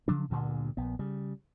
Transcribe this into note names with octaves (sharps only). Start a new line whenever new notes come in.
C#3 F3 F#3 D4
D2 G2 A#2 D3
A#1 B3
C#3 G3